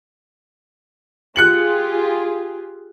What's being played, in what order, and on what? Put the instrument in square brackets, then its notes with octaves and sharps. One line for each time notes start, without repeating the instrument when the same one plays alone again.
[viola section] F4 G4 G#4 [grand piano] F#6 C#7 F#7